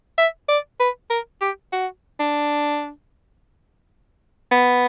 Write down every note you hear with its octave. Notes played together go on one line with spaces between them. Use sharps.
E5
D5
B4
A#4
G4
F#4
D4
B3